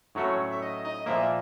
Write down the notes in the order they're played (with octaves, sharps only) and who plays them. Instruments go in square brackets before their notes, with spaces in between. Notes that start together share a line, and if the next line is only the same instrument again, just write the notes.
[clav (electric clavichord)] A2 F#3 A3 C#4 F#4 [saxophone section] C#5
[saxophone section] D5
E5
D#5
D#5
[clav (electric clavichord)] A#2 F3 A#3 [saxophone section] E5